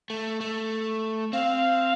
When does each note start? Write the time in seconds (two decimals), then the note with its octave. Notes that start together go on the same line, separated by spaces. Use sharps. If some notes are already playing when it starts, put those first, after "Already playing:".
0.10 A3
0.41 A3
1.33 C4 F5